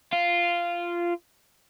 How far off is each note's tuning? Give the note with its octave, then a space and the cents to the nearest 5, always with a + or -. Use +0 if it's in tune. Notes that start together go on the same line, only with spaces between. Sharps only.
F4 -10